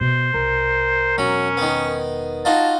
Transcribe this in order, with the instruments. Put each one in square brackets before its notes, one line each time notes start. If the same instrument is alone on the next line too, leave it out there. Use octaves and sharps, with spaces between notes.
[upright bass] B2 [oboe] C5
[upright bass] C2 [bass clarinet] A#4
[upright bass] E1 [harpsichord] F#3 [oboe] C#4
[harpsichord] D#3 B3
[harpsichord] D#4 F4 F#4 [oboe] A5